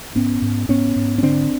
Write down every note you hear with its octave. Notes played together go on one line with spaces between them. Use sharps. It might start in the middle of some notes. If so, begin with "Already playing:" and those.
G#2 B3 C#4
G#2
G#2 B3 C#4
G#2
C#4
D3 C4 D4